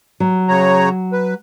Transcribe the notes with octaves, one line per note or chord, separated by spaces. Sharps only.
F#3
C#3 C#5 A#5
B4